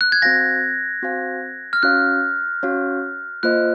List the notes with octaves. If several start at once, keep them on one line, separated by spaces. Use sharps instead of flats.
F#6
G#6
C4 F#4 C5 F5 G#5 A#6
C4 F#4 C5 F5 G#5
F6
C#4 F#4 C#5 F5 F#6
C#4 F#4 C#5 F5
A#3 F4 C5 D#5 F#6